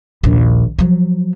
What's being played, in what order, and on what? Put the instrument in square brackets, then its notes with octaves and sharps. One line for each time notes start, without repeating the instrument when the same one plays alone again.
[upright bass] A#1 D#2
F3 F#3